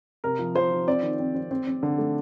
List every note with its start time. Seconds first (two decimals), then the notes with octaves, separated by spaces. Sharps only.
0.24 C3 A#4
0.39 F3
0.55 F3 C5
0.71 F3
0.87 C4 D5
1.03 D#3
1.19 C4
1.35 C4
1.51 C4
1.67 C4
1.83 D3
1.98 A3